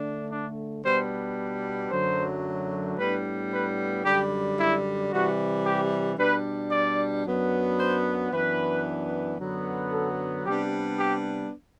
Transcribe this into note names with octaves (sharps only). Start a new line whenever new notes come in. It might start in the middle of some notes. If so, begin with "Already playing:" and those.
Already playing: D3 A3 D4
D4
B2 G3 B3 D4 C5
F#2 D3 F#3 A3 C5
A2 G3 B3 D4 B4
B4
F#2 D3 G3 G4
E4
C3 E3 G3 F#4
G4
B2 G3 D4 B4
D5
F#2 F#3 B3 D4
C5
F#2 E3 B3 D4 B4
F#2 D3 F#3 B3
A4
C3 G3 B3 D4 G4
G4